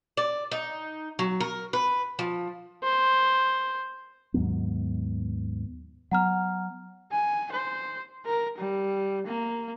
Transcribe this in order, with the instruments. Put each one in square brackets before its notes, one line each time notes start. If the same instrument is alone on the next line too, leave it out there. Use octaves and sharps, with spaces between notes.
[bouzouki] D5
D#4
F#3
A#4
B4
F3
[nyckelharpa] C5
[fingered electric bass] D#2 G#2 F#3 B3
[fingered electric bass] F#3 B3 [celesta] F#5 A#5 F6
[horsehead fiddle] G#5
C5
A#4
G3
A#3